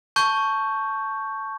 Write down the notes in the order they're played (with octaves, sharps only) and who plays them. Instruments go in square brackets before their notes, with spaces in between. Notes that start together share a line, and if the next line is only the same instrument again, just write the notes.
[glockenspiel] A5 C#6 G6